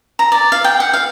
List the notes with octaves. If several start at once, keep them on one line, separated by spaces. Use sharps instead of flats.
A#5
D5
F5
G5
F#5
F5